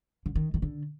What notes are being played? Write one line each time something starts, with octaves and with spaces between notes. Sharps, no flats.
D3
D#3
D#3
D3